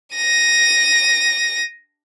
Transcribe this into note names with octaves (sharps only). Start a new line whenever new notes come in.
A#6 D#7